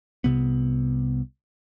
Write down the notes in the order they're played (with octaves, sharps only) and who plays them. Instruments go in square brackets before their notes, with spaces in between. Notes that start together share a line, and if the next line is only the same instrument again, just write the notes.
[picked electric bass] C2 C3 B3